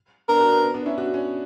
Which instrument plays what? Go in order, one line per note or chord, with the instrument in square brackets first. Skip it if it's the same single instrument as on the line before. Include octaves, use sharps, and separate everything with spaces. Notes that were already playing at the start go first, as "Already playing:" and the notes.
[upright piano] B3 D4 [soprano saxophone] A#4
[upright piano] D4 F#4
B3 D4
B3
B3 D4
C#4 E4
D4 F#4
C#4